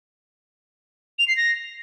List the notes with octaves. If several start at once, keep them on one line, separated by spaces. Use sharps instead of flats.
F7
C7
A#6